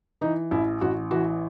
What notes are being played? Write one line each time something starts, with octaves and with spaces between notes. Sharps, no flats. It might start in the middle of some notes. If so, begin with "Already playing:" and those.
E3 D#4
A1 E4
A1 F#4
E3 F#4